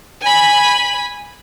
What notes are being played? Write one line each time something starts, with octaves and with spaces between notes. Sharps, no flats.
G#5 B5